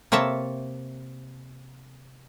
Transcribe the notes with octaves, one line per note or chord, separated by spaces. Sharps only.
C3 A#3 C#5 E5 A5